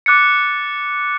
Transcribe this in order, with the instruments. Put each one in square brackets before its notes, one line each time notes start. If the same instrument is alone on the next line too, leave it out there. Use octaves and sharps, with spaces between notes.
[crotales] D6 F#6 A6 C#7